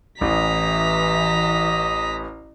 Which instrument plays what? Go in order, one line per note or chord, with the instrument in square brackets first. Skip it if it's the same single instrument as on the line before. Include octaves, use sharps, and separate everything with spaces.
[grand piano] A1 [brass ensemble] E3 [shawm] D#5 [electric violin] A#5 B6